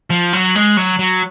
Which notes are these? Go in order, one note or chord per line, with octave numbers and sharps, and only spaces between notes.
F3
F#3
G#3
F#3
F#3